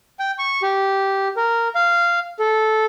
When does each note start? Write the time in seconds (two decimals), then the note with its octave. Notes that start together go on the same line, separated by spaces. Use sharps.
0.19 G5
0.39 C#6
0.62 G4
1.37 A#4
1.75 F5
2.39 A4